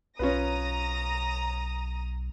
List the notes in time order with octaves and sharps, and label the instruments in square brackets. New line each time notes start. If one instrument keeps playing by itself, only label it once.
[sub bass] B1 [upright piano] C#4 F4 B4 [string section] A#5 D#6 A#6